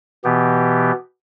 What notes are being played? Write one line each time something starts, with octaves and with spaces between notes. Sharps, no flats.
B2 E3 B3 G4